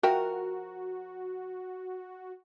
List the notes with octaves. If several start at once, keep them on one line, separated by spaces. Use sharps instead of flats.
F3 F#4 A#4 E5 G5